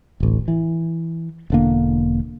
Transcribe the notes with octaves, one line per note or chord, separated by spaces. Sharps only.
D1 A1
E3
E1 D3 A#3